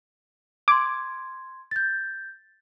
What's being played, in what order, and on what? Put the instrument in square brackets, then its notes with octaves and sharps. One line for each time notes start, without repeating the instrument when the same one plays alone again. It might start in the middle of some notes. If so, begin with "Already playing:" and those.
[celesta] C6 G#6 [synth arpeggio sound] D6
[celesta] G6 A6